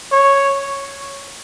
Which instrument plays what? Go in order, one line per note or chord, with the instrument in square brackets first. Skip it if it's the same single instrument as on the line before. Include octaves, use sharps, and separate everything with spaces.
[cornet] C#5